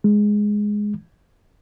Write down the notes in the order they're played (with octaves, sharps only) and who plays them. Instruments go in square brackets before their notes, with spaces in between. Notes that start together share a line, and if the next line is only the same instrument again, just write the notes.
[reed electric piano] G#3